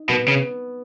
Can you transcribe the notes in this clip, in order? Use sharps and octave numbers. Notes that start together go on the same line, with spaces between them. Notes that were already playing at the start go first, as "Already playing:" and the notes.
Already playing: D#4
B2 B3
C#3